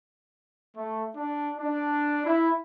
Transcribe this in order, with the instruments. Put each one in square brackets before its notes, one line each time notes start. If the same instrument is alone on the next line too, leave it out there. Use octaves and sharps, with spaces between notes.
[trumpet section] A3
D4
D4
E4